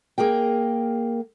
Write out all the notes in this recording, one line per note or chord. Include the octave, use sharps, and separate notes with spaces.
A#3 G#4 A#4 G5